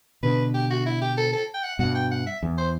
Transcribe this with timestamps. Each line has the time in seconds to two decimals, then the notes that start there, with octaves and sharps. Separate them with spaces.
0.23 B2 D3 B4
0.54 G4
0.70 F#4
0.86 E4
1.01 G4
1.18 A4
1.33 A4
1.54 G5
1.63 F#5
1.79 G2 B2 F#5
1.95 G5
2.11 F#5
2.27 E5
2.43 E2
2.58 C5